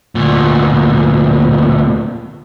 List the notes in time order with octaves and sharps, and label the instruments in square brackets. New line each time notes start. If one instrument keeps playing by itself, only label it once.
[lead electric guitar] D2 A#2